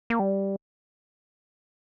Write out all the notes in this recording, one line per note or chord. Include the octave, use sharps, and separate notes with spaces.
A#3
G3